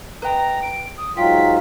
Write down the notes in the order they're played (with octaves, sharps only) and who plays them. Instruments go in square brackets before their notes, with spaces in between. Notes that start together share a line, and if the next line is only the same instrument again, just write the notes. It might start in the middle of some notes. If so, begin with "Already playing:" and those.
[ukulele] B4 D#5 G5 [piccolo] A#5
[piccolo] D7
D#6
[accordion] G#2 F#3 F4 [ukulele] G5 [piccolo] B6